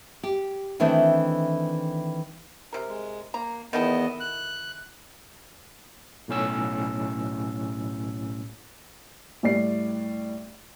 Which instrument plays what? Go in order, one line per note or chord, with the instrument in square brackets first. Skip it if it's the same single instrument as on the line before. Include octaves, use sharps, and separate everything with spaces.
[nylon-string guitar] G4
D#3 E3 A3 C4 D4 E4
[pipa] C3 A#4
[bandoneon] G#3
[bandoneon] A#3 [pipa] A#5
[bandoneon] E2 B3 D#5 [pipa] D#3 A3 E4
[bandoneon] F#6
[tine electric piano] B1 A2 C#4 E6
[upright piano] A2 G3 D5 C7